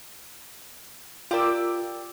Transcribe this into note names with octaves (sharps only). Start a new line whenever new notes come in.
F4 G4 A#4 D5 E6